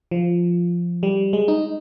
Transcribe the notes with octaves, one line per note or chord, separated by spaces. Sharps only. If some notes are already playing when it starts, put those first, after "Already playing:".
F3
G3
G#3
D#4